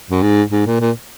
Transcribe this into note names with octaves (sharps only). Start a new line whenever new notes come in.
F#2
G#2
G#2
A#2
A#2